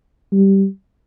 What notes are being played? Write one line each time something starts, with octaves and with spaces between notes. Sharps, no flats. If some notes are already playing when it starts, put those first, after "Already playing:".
G3